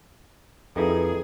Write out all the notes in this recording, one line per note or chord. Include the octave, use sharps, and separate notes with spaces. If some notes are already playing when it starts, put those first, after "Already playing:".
F2 D#4 E4 G#4 A4 B4